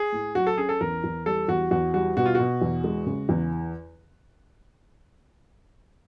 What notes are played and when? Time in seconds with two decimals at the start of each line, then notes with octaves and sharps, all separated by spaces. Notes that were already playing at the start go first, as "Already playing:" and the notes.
Already playing: G#4
0.12 A2
0.35 F#3 F#4
0.47 A4
0.58 C#4 G#4
0.69 A4
0.81 E2 A#4
1.04 E2
1.26 G3 A4
1.48 E2 F#4
1.71 E2 F#4
1.94 G3 F#4
2.17 B2 F#4
2.26 F4
2.35 B2 F#4
2.61 E2
2.84 G#3
3.07 C#3
3.29 E2